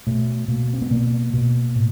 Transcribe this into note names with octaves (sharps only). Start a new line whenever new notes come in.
B2 A3
B2 A#3
C4
B3
B2 A#3
B2
A2